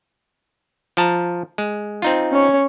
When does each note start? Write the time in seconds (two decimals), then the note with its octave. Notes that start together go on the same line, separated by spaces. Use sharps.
0.97 F3 A5 A#5
1.58 G#3
2.02 C4 D#4 F4
2.31 C#4 C#5